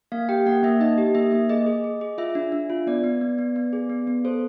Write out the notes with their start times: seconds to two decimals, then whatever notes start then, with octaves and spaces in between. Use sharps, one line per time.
0.12 A#3 F5
0.29 G4 G5
0.46 A#3 F#5
0.63 A#3 E5
0.80 D#4 D#5
0.98 G4
1.15 A#3 E5
1.32 A#3
1.49 G#4 D#5
1.66 G#4
1.84 G#4
2.01 G#4
2.18 F4 E5
2.35 D4
2.52 D4
2.70 F4
2.87 B3 D5
3.04 B3
3.21 B3
3.38 B3
3.56 B3
3.73 G#4
3.90 B3
4.07 B3
4.25 A4 C5